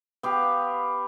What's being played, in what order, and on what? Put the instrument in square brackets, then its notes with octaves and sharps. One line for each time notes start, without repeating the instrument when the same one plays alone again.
[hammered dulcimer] B3 G4 F5